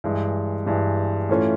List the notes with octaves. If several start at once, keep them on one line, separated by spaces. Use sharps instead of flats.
G2 E3 G#3
G2 E3 G#3
A2 E3 A3 C#4 F4